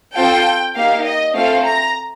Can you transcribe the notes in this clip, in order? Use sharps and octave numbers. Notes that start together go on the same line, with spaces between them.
C4 F4 A4 G5
A#3 D#4 G4 F5
D#5
A3 C4 F4 A4 F5
A#5